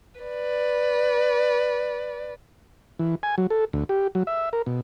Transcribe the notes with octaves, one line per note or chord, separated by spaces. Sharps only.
B4 D5
E3
G#5
F#3
A4
D2
G4
F#3
E5
A#4
B2